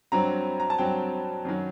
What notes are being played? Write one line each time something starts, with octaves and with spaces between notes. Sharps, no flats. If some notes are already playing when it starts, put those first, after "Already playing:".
G2 F#3 C4 A#5
A#5
A5
G2 F#3 C4 G5
F#2 D#3 F#3